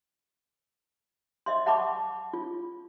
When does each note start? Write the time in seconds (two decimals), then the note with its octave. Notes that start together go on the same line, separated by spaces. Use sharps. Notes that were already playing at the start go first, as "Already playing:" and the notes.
1.46 D#5 E5 C6
1.66 E5 F#5 A5 B5 C#6 D6
2.33 F4